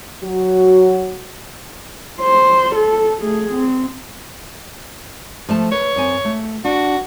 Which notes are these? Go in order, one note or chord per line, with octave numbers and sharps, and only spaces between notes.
F#3 F#4
C5
A4
A3 G#4
C4
F3 A3 A5
B4 C#5
F#2 C4 G#5
A3
D4 F#4